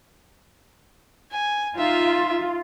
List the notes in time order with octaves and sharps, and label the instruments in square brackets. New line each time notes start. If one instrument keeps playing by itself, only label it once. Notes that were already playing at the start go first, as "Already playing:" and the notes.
[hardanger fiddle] G#5
[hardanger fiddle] D#4 E5 [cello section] F4